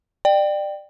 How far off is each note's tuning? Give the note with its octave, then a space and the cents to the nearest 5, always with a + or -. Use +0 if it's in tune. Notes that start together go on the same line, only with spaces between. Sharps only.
D5 +25 G5 +0